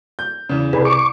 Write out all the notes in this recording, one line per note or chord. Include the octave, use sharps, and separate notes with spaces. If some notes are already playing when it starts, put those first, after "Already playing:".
G6
E2 C#3
C2 G#4 B4
C#6 D6